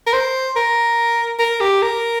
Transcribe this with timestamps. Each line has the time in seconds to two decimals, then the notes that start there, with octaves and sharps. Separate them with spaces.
0.07 A#4
0.13 C5
0.56 A#4
1.39 A#4
1.60 G4
1.82 A#4